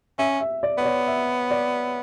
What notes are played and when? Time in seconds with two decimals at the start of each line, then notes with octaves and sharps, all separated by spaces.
0.19 C#4 E5
0.40 E5
0.63 D5
0.78 B3 C#5
0.85 D5
1.07 E5
1.51 D5